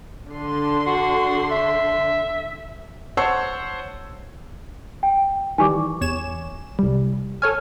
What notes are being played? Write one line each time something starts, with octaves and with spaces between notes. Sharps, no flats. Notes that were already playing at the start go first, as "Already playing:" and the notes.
D3 C6
F#4
E5
C5 C#5 F#5 A5 C#6 E6
G5
D#3 E3 G3 G#5 C#6 D6
E2 C#5 E7
C2 G3
A4 C#5 G#5 F6